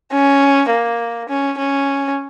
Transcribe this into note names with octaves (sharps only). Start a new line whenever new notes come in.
C#4
A#3
C#4
C#4